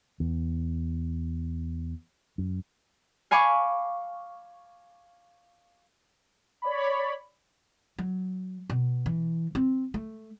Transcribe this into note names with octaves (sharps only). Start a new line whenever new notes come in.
E2
F#2
F5 G#5 B5 C#6 D6
C#5 D5 B5
F#3
B2
E3
C4
A3